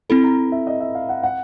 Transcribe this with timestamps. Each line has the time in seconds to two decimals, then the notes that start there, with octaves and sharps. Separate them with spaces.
0.09 C4 E4 A4 B5
0.23 A#5
0.52 E5
0.67 D#5
0.80 E5
0.95 F5
1.09 F#5
1.23 F#5